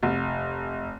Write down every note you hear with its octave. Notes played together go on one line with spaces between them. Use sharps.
F1